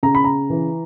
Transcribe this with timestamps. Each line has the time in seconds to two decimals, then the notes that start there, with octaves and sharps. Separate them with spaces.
0.03 C#3 A#5
0.15 B5
0.24 A#5
0.50 E3